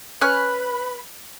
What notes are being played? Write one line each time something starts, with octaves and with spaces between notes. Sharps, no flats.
C#4 B4 C#5 G#5 B5 F6 F#6